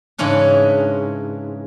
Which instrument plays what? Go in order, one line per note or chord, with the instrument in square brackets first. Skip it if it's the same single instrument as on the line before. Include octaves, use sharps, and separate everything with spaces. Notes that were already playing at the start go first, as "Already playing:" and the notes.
[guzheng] G#2 C#3 E3 C#4 D4